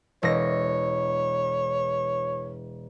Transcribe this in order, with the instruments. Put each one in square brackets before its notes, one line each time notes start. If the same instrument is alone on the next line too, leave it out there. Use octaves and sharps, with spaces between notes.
[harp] E1 A#6 [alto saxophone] C#5